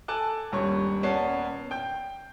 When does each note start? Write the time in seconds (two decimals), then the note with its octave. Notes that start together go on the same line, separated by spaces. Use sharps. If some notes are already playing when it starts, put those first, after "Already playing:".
0.08 A4 G#5 A5 D6 F#6
0.52 D#1 G2 C#5 C#6
1.03 D#1 B3 C#4 D5 A5 C7
1.71 G5 G6